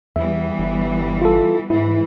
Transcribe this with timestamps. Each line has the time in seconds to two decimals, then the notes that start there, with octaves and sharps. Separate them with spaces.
0.16 E2 E3 G3 B3 E5
0.59 G1
1.22 F4 A4
1.70 G#2 E3 E4